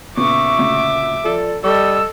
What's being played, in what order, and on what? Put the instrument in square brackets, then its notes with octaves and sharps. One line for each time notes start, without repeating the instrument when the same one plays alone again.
[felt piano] A#2 C#3 B3 [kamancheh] E5 D6 [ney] C#6
[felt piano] D2 A#2 C#3
[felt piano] F3 [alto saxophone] A4 [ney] D5
[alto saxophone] G3 [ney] A4 [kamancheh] D#5 E6 [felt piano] C#6